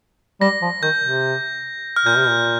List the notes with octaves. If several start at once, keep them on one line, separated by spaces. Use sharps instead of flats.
G3 A#6
F3
D#3 G6
C3
F6
A#2 G6
C3
A#2